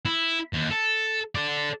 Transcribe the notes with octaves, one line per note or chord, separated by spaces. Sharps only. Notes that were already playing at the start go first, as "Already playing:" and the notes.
E4
D#2
A4
A4 D5